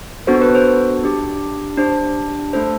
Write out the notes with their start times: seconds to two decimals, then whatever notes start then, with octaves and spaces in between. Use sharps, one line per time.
0.27 B3 D4 F#4 A4 C5
0.42 B4
0.55 C5
1.03 D4 G4
1.78 D4 G4 C5
2.53 A3 D4 A4 C5